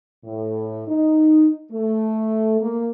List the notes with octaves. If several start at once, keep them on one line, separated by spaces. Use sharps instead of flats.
A2
D#4
A3
A#3